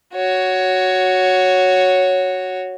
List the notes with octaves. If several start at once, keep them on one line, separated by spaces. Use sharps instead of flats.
F#4 C#5